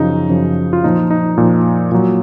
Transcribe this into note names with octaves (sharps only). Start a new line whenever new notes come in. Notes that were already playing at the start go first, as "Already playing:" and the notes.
Already playing: F#2 C#3 F3 D#4
F#2 C#3 F3
F4
A#2 F3 D#4
D#4
A#2 F3
A#2 F#3